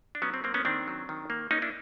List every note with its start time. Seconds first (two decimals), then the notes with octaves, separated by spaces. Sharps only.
0.15 D4
0.22 F#3 B3 C#4
0.34 C4
0.44 A#3 C4
0.54 B3 C#4
0.65 D#3 C4 D4
0.88 F#3
1.09 D#3
1.30 A#3
1.51 A#3 C#4 D#4
1.62 D4 E4